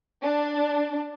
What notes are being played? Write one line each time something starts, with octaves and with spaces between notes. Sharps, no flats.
D4